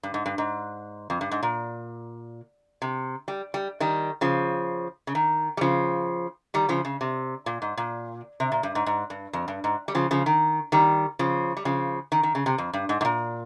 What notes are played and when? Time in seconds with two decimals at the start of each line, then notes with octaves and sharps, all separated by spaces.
0.03 G2
0.14 G#2
0.26 G2
0.38 G#2
1.10 F2
1.21 G2
1.31 G#2
1.43 A#2
2.82 C3
3.28 G3
3.54 G3
3.80 D#3 G3
4.21 C#3 F3
5.07 C#3
5.15 D#3
5.57 G3
5.61 C#3 F3
6.54 D#3 G3
6.69 C#3 F3
6.85 C#3
7.01 C3
7.46 A#2
7.62 G#2
7.77 A#2
8.40 C3
8.52 A#2
8.63 G2
8.75 G#2
8.86 G#2
9.10 G2
9.33 F2
9.48 G2
9.64 G#2
9.88 G3
9.95 C#3 F3
10.11 C#3 F3
10.26 D#3
10.72 D#3 G3
11.19 C#3 F3
11.57 G3
11.65 C#3 F3
12.12 D#3
12.23 D#3
12.35 C#3
12.46 C3
12.58 F2
12.73 G2
12.89 G#2
13.01 G#2
13.05 A#2